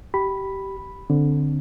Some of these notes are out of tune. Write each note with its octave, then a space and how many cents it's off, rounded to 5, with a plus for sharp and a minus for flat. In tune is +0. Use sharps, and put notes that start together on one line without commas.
G4 -20 B5 +0
D3 +0 C4 +0